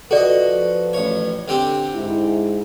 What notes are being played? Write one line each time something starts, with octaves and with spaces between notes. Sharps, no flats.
F3 F#4 A4 B4 D5 D#5
A1 C#5
D3 C4 G4
G#2 E4